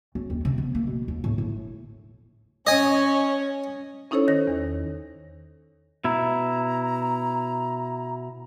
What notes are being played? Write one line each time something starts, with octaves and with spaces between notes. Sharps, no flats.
F#2
D#2
C3
B3
A#3
B2
D#2
A2
A2
C#4 C#5 D#5 G#5
C#4 D#4 E4 A4 C5 C#5
D#3 C#5 A#6
E2
B2 E4 A#5